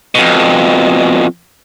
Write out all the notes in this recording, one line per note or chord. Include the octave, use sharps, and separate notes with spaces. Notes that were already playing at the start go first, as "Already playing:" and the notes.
F2 B2